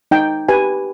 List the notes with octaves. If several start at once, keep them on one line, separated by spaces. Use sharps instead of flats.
D#4 G5
G4 B4 G#5